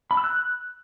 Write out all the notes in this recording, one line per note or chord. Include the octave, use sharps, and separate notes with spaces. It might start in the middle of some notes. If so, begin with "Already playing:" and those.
B5
E6
F#6